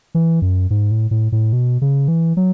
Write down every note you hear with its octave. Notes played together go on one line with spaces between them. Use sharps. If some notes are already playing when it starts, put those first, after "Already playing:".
E3
F#2
G#2
A2
A2
A2
B2
C#3
E3
F#3